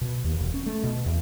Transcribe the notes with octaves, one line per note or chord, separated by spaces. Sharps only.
B2
D#2
E1
C#4
A3
B2
E2